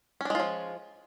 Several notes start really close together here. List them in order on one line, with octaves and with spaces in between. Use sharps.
C#4 D4 G#3 F4 F3